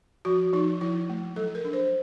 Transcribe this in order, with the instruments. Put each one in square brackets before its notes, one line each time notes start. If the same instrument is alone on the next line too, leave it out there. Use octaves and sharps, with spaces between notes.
[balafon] F3 F#4
F3 D#4
F3 E4
A3
F#3 A4
A#4
D4
C5